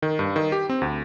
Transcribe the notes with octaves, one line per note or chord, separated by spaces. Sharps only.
D#3
G2
D#3
G4
C4
D2